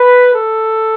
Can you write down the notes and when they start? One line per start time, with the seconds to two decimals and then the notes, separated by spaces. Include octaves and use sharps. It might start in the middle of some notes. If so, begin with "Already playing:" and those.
Already playing: B4
0.33 A4